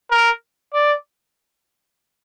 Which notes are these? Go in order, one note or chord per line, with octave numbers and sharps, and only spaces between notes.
A#4
D5